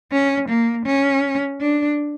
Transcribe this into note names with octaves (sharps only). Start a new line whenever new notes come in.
C#4
A#3
C#4
D4